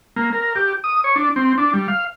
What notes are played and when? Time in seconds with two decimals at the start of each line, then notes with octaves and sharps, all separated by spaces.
0.16 A#3
0.33 A#4
0.56 G4
0.84 D#6
1.04 C#5
1.16 D4
1.36 C4
1.58 D4
1.73 G3
1.88 F5